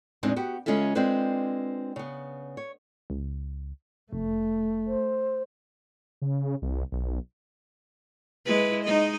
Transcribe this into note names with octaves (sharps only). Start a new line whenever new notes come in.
E2 A#2 G#3 C4 D4 D#4
B3 F#4 G4
C#3 G#3 C#4 F4 A4 E5
G#3 C4 D4 F4 B4 C5
C#3 B3
C#5
C#2
F1 A3
C5
C#3
C2
B1
G#3 E4 B4
G#3 D#4 D#5